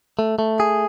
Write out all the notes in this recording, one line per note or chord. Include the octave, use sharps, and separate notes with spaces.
A3
A3
G#4